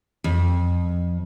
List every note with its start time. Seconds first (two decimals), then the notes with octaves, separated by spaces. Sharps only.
0.24 F2